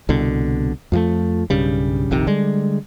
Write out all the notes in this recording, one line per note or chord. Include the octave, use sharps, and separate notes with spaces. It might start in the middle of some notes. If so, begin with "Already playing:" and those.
C2 B2 D3
F2 F3 G#3 A3
B1 G2 C#3 G3
F1 A#1 C3 D#3
D3 G3 G#3